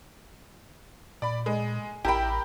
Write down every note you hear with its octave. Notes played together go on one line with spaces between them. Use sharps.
A#2 D5 B5
G#3
A1 E4 G4 A#4 G5 B5